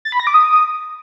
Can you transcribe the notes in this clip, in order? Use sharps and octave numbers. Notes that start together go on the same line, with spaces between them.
A6
B5
A#6
D6
D#6